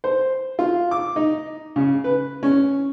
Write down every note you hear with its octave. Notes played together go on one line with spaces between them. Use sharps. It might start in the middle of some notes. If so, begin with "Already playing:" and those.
C5
F4
D6
D#4
C#3
B4
C#4